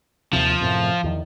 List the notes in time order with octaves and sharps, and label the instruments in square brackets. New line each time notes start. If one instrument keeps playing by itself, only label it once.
[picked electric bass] D#2 C3 [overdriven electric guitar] F3
[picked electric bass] F#2 A2 C3
E2 D#3